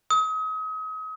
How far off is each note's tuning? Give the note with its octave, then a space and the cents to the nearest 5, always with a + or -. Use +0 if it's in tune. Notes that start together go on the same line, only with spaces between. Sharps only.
D#6 +35